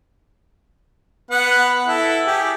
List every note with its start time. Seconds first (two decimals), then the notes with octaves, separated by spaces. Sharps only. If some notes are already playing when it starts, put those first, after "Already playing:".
1.31 B3 B4 F#5
1.87 E4 A4
2.27 G4 G#4